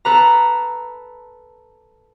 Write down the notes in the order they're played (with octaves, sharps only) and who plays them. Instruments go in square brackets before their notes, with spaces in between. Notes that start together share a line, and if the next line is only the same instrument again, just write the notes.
[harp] A4 B4 A#5